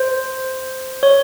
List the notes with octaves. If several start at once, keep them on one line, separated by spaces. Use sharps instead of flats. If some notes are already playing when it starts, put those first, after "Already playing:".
Already playing: C5
C#5